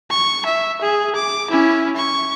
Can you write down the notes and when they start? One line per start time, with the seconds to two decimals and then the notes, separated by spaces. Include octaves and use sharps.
0.10 C#6
0.45 E5
0.81 G#4
1.15 D6
1.50 C#4 E4
1.96 C#6